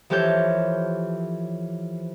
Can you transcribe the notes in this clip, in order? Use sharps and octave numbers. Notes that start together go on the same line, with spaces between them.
E3 F3 G4 A4 C#5 G6